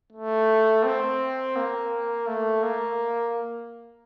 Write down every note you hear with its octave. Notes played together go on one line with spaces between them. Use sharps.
A3
C4
A#3
A3
A#3